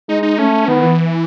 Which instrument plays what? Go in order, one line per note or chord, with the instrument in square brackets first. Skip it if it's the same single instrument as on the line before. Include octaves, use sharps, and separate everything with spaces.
[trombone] G#3 [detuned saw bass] D#4
[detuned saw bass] D#4
[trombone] A3 [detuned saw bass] C#4
[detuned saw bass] D#3 [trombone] B3
[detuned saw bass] E3